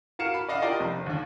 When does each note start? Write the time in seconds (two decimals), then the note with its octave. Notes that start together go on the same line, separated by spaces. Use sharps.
0.19 F#4 A#4 F5 C#7 E7
0.34 B5
0.49 D5 D#5 F5 F#5
0.62 F4 G4 A#4 D5 D#5
0.80 F1
1.06 D#2 D3